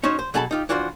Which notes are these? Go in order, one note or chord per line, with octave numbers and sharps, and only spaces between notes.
C#4 D#4 F#4 C5 C#5
C5
B2 F#3 G#4 A4 A5 B5
D#4 F4 G4
E3 D4 F4 F#4 B4 C5